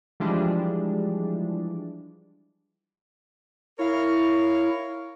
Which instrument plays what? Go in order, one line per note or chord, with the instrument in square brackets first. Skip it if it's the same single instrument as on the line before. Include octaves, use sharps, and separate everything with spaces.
[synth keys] E3 F3 G3 G#3 D4
[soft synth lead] E4 [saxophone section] A#4 C#5 F5